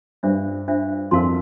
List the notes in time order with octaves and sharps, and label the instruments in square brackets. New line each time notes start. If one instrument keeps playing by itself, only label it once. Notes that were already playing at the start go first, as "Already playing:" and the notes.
[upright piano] G2 [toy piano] D4 F4 C5 E5
[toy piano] D4 F4 C5 E5
[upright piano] F2 [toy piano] A#4 F5 A5 C6